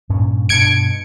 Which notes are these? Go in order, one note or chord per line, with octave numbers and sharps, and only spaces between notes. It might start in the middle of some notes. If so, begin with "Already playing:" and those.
G2 A#2 C#4
G2 B2 D4 G#6 C#7 D7